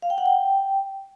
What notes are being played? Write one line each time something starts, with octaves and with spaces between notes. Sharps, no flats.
F5
G5
F#5
G5